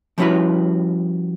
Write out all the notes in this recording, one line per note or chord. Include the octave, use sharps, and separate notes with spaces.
F3 G3 C#4 E4 F#4 B4